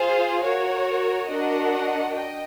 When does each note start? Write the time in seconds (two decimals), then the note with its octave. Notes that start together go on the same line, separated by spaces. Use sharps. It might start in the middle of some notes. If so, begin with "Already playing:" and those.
Already playing: F4 G#4 C5 F5
0.44 F#4 A#4 C#5
1.29 D4 F#4 A#4 D#5 F#5
2.15 D#5 G5